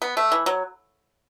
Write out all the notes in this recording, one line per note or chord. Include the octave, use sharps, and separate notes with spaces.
B3
A3
E3
F#3